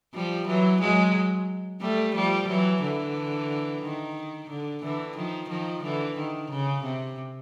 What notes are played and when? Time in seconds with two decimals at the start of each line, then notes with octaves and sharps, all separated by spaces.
0.14 F3 G3
0.47 E3 F#3
0.80 F#3 G#3
1.81 G3 A3
2.15 F3 G3
2.48 E3 F#3
2.82 D3 E3
3.83 D#3
4.49 D3
4.83 D3 E3
5.16 D#3 F3
5.49 D#3 F3
5.83 D3 E3
6.17 D#3
6.51 C#3
6.84 C3